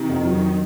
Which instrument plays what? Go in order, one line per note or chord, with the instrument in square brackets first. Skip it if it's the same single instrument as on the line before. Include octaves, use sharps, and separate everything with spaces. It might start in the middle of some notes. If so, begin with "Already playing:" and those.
Already playing: [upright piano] C3 [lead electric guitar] D#3
[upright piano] F2
F#3